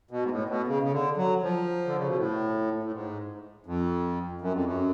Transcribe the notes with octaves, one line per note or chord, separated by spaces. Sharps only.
B2
G#2
A2
B2
C#3
C#3
D3
F#3
F3
D3
C#3
B2
A2
A2
G#2
F2
F#2
F2
F#2